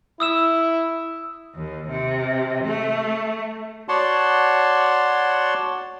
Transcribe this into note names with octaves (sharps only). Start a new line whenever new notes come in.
E4 D#6 E6 E7
D#2
C3
A3
F#4 C#5 D5 F#5 A5 C6